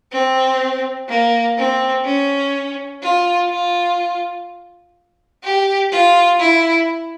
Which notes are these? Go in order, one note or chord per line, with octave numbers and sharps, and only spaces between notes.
C4
A#3
C4
C#4
F4
F4
G4
F4
E4